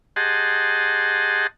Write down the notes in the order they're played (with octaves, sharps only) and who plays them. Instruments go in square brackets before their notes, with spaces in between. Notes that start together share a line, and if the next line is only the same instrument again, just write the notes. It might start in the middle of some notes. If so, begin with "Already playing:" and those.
[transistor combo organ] G4 G#4 D#5 F#5 A5 C6